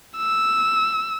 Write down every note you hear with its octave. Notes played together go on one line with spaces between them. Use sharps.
E6